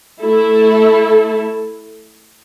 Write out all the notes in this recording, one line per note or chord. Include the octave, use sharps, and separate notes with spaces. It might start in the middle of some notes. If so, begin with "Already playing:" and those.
A3 E4 A4